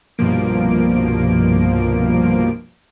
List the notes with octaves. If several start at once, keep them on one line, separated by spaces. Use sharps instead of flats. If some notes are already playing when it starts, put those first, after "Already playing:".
C2 G2 B2 F3 A#3 D7